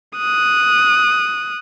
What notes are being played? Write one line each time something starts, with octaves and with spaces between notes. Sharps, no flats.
D#6 F#6